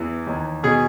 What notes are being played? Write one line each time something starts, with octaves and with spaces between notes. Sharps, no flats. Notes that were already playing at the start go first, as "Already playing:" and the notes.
Already playing: E2 E3
D#2
B2 G#4